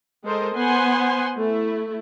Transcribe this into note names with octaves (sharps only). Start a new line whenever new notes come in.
G#3 A4 A#4 C5 D#5
B3 C5 F#5 G#5 C6
A3 E4